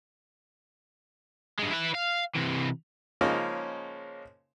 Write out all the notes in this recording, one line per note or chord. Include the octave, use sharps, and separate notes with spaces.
G2 G#3
E4 B4
F5
C3 E3
C#3 F3 G#3 A#3 C#4 D#4